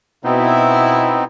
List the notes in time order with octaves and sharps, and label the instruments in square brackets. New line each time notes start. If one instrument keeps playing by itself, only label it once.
[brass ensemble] B2 E4 [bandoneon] B3 C4 D#4